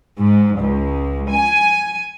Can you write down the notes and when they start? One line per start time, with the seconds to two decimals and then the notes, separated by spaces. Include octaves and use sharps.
0.18 G#2
0.58 C#2
1.30 G#5